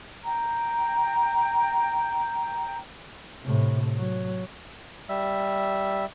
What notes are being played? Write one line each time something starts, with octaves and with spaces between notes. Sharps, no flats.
G5 A#5
A2 C3
F#3
G3 E5